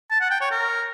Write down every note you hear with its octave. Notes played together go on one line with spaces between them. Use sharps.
A5
F#5
G5
C#5
A#4